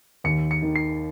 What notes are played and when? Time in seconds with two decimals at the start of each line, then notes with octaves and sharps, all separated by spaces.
0.24 D#2 C#7
0.51 C#7
0.63 D#3
0.76 C7